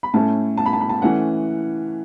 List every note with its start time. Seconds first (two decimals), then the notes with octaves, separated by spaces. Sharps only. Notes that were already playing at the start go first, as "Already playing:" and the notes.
0.03 B5
0.14 A2 A3 C#4 A5
0.57 A5
0.66 B5
0.73 A5
0.81 B5
0.89 A5
1.02 E3 A3 C#4 F#5